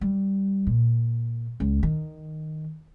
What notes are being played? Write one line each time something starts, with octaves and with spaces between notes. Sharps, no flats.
G3
A#2
C#2
D#3